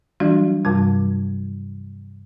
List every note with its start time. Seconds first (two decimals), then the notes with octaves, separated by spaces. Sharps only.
0.20 E3 F#3 G3 D4 F#4
0.65 G2 C3 G3